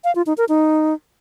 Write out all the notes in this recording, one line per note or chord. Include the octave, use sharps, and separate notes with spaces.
F5
F4
D#4
A#4
D#4